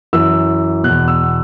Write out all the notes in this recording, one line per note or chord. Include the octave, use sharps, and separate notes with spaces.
F#2 E3 E6
E2 B2 F#6
E6